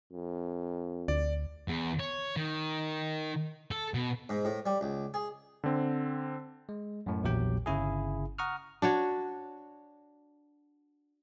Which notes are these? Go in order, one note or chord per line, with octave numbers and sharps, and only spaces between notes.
F2
D2 D5
E2
C#5
D#3
A4
B2
G#2
A2
G3
C#2
G#4
D3 C4
G#3
F#2 A2
A#1 E2 A#2 F#3 G4 G5
G1 C#3 E4 G#4
F#5 A#5 C#6 D#6 F6
D4 F#4 C#5